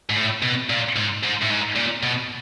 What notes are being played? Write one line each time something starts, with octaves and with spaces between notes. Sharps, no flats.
G#2
A2
B2
A#2
G#2
G#2
A2
G#2
A#2
B2